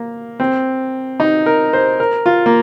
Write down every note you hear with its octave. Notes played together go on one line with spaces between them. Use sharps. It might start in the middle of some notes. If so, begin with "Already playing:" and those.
Already playing: A#3
C4
D#4
A#4
C5
A#4
F4
A#3